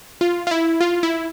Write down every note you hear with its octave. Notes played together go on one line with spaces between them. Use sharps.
F4
F4
E4
F4
E4